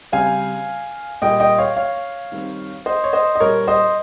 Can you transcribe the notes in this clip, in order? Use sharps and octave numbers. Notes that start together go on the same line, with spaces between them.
C#3 G3 C4 F5 G#5
A#2 G3 A#3 D#5 G5
D#5 G5
C#5 F5
C#5 F5
D#3 G3 C4
C5 D#5
C#5
C5 D#5
D#5
A#2 G3 A#3 A#4 C#5
C5 D#5